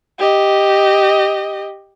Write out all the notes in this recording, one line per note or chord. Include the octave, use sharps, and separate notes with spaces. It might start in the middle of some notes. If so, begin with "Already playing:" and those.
G4 D#5